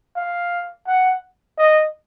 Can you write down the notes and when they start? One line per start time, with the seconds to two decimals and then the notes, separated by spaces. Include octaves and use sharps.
0.16 F5
0.87 F#5
1.58 D#5